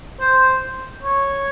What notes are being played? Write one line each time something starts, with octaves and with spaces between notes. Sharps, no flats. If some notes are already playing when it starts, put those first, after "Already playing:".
C5
C#5